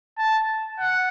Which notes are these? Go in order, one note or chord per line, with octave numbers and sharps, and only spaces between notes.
A5
F#5